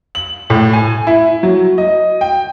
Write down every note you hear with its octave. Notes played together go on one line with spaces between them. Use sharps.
F#7
A2
G#5
E4
F#3
D#5
G5